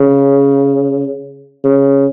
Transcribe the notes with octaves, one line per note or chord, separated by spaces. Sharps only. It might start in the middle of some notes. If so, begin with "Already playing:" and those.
Already playing: C#3
C#3